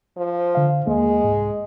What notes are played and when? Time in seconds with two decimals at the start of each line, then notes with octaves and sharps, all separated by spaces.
0.17 F3
0.55 D3 F5
0.87 D#2 G#3 A#3
1.24 C2 G#2